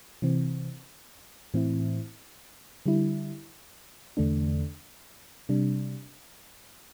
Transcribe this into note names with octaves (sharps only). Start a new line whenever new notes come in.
C3 E3 C4
A2 E3 C4 E4
D3 G3 E4
E2 D3 A3 D4
C3 G3 D4